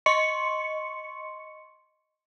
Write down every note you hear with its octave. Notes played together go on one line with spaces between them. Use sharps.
D#5 C6 C#6 C#7